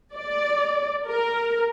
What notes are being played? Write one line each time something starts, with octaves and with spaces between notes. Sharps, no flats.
D5
A#4